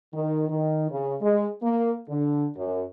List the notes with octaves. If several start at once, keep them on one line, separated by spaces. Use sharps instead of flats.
D#3
D#3
C#3
G#3
A#3
D3
F#2